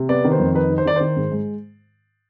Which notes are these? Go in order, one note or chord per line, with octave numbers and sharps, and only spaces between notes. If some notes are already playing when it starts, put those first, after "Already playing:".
Already playing: C3
B3 D5
D#3
C5
F2
D#4 B4
D#3
C5
D#3 D5
D#3 C5
G#2
G#3